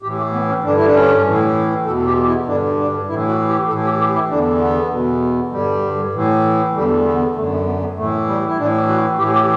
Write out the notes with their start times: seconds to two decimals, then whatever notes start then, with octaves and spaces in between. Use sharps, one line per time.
0.03 A2 G4
0.06 E3
0.18 A3
0.33 B3
0.49 C#4
0.64 G2 D3 D4
0.77 E4
0.86 D4
0.94 C#4
1.25 A2 E3
1.86 E2 B2 A4
2.06 G4
2.27 E4
2.47 G2 D3 D4
2.78 D4
3.08 A2 E4
3.13 E3
3.28 F#4
3.49 G4
3.68 A2 E3 A4
3.85 G4
4.00 G4
4.14 E4
4.30 E2 D3 D4
4.60 B3
4.91 E2 B2
5.52 G2 D3 G3
6.13 A2 E3
6.74 E2 D3 G3
7.05 B3
7.35 F#2 D3 A3
7.51 B3
7.66 B3
7.81 B3
7.96 A2 E3 A3
8.27 G3
8.47 E4
8.57 A2 E3 D4
8.88 F#4
9.18 A2 E3 G4
9.34 G4